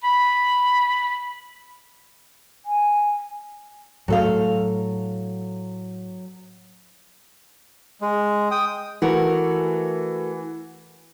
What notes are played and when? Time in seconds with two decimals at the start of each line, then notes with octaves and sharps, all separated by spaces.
0.04 B5
2.66 G#5
4.08 A2 F#3 A4 F5
8.01 G#3
8.51 G5 D#6
9.02 E3 A3 F#4 A#4